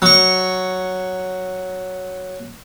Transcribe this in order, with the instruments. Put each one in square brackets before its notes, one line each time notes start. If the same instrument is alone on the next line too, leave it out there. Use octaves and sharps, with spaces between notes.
[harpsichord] F#3 C#6